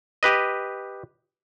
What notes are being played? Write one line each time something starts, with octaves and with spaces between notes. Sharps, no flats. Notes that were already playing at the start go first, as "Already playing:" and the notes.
G4 B4 D#5